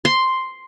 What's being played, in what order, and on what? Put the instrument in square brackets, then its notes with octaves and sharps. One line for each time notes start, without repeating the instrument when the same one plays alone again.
[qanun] C6